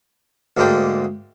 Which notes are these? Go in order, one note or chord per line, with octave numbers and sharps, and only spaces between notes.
D2 G#2 G#3 A#3 D4 G5